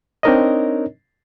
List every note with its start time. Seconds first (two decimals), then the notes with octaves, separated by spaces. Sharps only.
0.23 C4 D4 D#4 A#4 C#5 D#5